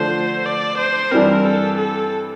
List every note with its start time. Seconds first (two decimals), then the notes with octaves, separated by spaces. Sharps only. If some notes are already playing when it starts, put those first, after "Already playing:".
Already playing: D3 F3 A3 C5
0.46 D5
0.78 C5
1.12 G2 E3 G3 C4 A#4
1.45 A4
1.78 A4